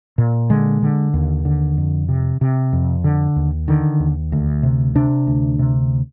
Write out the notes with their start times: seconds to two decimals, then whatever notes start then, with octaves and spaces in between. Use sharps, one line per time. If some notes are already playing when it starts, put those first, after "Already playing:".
0.18 A#2
0.50 D3 G#3
0.82 D3
1.14 D#2
1.45 D3
1.78 F2
2.09 C3
2.41 C3
2.73 F2
3.04 D3
3.36 D#2
3.68 D3 D#3
4.00 D#2
4.32 D2
4.63 C3
4.95 C3 D4
5.27 D2
5.59 C3